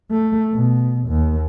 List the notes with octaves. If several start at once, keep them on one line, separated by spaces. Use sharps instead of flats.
A3
B2
D#2